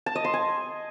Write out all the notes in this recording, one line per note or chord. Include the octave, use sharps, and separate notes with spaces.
A5
D#5
C6
G#5